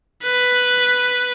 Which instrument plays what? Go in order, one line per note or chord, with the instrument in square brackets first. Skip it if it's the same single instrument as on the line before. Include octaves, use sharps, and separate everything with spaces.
[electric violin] B4